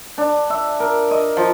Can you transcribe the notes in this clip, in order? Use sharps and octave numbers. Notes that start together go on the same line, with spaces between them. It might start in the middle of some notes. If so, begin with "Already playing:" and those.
D4
E5
A#4
D#5
F3